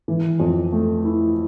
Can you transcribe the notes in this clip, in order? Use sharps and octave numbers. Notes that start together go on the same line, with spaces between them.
E3
F2
A3
E4